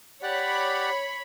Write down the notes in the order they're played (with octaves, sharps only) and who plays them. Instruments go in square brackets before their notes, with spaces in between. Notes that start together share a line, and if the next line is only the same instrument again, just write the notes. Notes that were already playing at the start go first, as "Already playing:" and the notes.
[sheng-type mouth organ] G4 D5 F#5 [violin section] C#5 B5